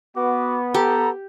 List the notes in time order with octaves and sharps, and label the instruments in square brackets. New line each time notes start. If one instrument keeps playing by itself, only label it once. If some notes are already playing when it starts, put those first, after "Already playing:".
[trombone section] B3 [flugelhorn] F#4 [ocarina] D6
[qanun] G4 [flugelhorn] A4 [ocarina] A#5